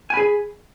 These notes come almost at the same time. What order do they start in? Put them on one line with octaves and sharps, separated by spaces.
G#5 B5 G#4